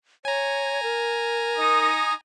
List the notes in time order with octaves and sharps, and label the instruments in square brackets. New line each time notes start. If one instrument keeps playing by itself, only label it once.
[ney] C#5 [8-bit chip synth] G#5 A#5
[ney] A#4
[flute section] D#4 D#6